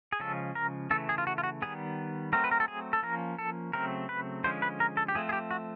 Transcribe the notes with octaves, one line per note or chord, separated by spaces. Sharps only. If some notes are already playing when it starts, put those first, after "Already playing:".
G#4
C#3 F3 G#3 C#4 A4
A#4
C#3 E3 A3 A4
G#4
F4
F#4
F4
F#4
D#3 G3 B3 G#4
F#3 A3 C4 A#4
B4
A#4
A4
G#4
A4
F3 A#3 C#4 A#4
A4
C#3 F#3 A3 C4 A#4
B4
D3 F3 G#3 C#4 C5
B4
A#4
A4
G4
F3 A3 C4 G#4
G#4
G4
F#4